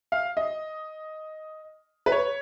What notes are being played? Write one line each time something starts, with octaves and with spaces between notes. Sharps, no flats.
F5
D#5
B4
C#5